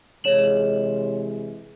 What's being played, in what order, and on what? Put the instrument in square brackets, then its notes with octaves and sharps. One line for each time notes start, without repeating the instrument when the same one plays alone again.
[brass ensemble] C3 E3 G#3 [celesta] C#5 E7 F#7